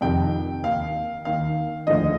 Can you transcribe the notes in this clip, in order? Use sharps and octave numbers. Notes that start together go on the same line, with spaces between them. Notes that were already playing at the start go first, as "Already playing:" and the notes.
F2 C3 D#3 G5
D#2 D#3 F5
D#2 D#3 F5
D2 D3 F3 D#5